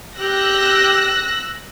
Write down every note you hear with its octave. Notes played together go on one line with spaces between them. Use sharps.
G4 E6 F#6 A#6